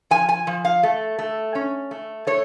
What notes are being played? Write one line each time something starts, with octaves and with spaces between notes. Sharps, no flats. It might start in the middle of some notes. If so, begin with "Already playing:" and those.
F3 G#5
G#5
F3
F5
A3
A3
C#4
A3
A3 C#5